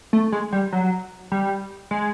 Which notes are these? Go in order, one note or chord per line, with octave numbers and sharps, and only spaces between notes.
A3
G#3
G3
F#3
G3
G#3